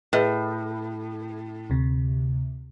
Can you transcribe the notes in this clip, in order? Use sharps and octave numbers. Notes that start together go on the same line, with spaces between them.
A2 G#4 B4 D#5
D2 C3